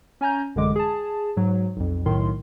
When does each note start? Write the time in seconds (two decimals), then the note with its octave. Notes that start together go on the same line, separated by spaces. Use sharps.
0.21 C#4 G#5 A#5 G6
0.56 A1 F#2 D3 G#3 D6
0.76 G#4 A5
1.37 G#2 F#3
1.76 B1 F2
2.05 B1 A2 D#3 C6